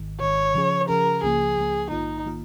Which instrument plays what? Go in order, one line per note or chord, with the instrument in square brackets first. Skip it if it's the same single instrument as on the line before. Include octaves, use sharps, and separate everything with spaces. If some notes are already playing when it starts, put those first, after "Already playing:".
Already playing: [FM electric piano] G#1 G#2 D#3
[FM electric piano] G#1 G#2 D#3 [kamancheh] C#5
[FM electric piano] C#3 F3 C#4 G#4
[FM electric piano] C#3 F3 C#4 G#4 [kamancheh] A#4
[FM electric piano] C#2 C#3 F3 A#3 [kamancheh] G#4
[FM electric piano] C#2 C#3 F3 A#3
[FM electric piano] A#1 G#2 D#3 A#3 F4 [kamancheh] D#4
[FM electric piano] D#3 A#3 F4